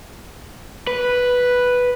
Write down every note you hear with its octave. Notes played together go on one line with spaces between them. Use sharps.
B4